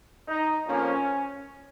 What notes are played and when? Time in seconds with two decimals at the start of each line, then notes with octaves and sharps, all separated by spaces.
0.27 D#4
0.66 F2 F3 A#3 C#4